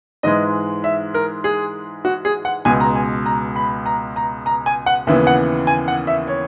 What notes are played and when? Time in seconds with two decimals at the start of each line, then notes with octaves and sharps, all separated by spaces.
0.23 G#2 E3 G#3 D#5
0.84 E5
1.14 A#4
1.44 G#4
2.05 F#4
2.25 G#4
2.45 F#5
2.65 C#2 B2 G#3 G#5
2.80 A#5
2.95 G#5
3.26 A#5
3.56 B5
3.86 A#5
4.16 A#5
4.46 A#5
4.66 G#5
4.86 F#5
5.07 D#2 C#3 E3 B3 E5
5.27 F#5
5.67 G#5
5.88 F#5
6.07 E5
6.27 C#5